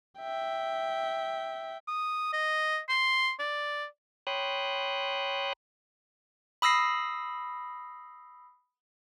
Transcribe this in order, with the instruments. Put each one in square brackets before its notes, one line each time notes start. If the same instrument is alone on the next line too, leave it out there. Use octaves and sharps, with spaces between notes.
[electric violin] E5 G5
[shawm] D#6
D#5
C6
D5
[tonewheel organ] C#5 G5 B5 C6 D#6 F#6
[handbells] B5 D#6 E6 A#6 C7